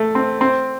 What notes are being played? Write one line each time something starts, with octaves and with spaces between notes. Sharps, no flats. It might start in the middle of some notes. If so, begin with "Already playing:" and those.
Already playing: A3
C4
C4